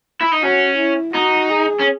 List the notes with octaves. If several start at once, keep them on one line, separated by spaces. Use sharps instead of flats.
E4
D#4
C#4 F#4
E4
D#4 F#4
G#4
C#4